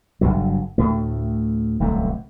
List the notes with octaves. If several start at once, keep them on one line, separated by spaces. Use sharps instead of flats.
F#1 C2 G2 F#3
D2 A2 A3
D1 C2 F#2 A3